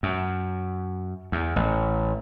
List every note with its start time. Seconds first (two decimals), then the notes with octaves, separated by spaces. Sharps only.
0.03 F#2
1.32 E2
1.56 A1